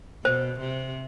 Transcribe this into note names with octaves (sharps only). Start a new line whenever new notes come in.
B2 C5
C3